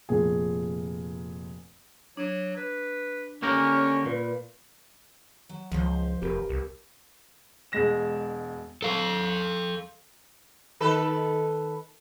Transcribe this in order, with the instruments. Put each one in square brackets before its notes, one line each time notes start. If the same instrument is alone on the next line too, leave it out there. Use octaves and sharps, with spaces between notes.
[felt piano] F1 A#2 G#4
[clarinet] F#3 [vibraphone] D4
[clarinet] B4
[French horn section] D3 C#4 [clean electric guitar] A#3 G4 A#4 [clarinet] C#6
[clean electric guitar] A#2 [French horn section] B4
[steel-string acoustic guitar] F#3
[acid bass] C#2 [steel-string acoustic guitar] F3 C5
[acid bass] F1 [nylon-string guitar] G4 A#4 B4
[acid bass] C2
[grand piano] E1 G#3 A#6 E7
[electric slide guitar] A4 F5
[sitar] D#3 A4 B4